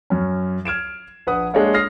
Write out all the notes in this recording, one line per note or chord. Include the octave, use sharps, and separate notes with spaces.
F#2 C#4
F6 G#6 D7 E7
A#1 B4 F#5 D#6
G#3 A#3 D4 C#5 D#5 F5
D#6 F6 A#6 C7